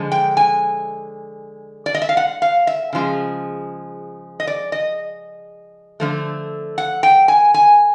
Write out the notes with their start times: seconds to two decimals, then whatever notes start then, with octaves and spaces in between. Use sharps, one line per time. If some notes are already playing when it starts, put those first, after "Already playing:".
Already playing: D3 F3 G#3
0.12 G5
0.37 G#5
1.86 D5
1.95 D#5
2.02 E5
2.09 F5
2.17 F#5
2.42 F5
2.67 E5
2.93 C#3 F3 G#3
4.40 D#5
4.47 D5
4.72 D#5
6.00 D3 F3 A3
6.78 F#5
7.03 G5
7.28 G#5
7.54 G#5